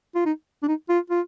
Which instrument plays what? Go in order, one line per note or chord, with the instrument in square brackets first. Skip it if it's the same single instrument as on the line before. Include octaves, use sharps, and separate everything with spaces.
[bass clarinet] F4
D#4
D4
D#4
F4
F4